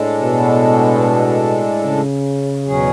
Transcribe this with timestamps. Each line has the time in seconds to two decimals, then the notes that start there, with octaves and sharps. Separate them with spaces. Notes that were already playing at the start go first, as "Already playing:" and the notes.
Already playing: A2 G#3 D4 A4
0.22 B2
1.85 C#3
2.66 E2 B2 F#3 C#4 G#4